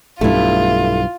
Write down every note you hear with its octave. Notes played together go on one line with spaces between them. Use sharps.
B1 G2 A3 E4 F4